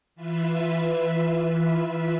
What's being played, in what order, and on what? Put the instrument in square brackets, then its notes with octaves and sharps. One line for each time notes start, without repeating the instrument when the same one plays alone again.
[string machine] E3 F4 B4 E5